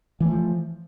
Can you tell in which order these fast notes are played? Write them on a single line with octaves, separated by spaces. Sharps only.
E3 A3 F3